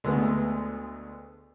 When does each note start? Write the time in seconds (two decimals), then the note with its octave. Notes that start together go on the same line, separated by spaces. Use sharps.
0.04 D2 G#3 A3 B3